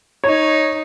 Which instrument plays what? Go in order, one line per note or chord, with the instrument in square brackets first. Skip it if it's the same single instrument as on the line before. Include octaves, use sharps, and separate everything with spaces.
[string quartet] D#4 [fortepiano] C#5